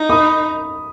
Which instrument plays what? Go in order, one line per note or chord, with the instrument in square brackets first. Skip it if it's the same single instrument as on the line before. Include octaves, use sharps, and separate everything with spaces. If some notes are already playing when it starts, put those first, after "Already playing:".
Already playing: [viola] D#4
[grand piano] B5 D#6